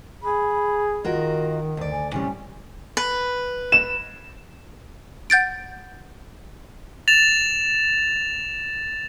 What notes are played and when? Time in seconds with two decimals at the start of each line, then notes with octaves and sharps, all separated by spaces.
0.23 G#4 B5
1.04 D#3 F4 F#4 A#4 D#5
1.77 D2 D5
1.91 G#5
2.12 A2 C3 G3 C#4 G#5
2.97 B4
3.72 E7
5.30 F#5 G6 A6 D7
7.08 A6 E7 F7